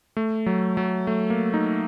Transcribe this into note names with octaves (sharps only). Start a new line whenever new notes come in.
A3
F#3
F#3
A3
A#3
D#4